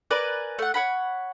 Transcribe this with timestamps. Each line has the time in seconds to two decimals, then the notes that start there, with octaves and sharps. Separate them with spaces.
0.11 A#4 B4 D5 G#5
0.59 A3 F#5
0.74 C#5 F#5 B5